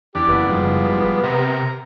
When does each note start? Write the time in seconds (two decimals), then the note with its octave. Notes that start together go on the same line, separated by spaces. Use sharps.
0.15 E2 D4 G4
0.28 F#1 B3
0.48 G#2 F3 G3
1.23 C3 A#4